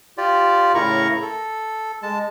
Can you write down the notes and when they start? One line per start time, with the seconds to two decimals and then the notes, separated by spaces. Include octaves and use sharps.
0.18 F4 G4 D5
0.75 A2 C#3 E4 A#4 A#5 C#6
1.22 A4
2.03 G#3 A5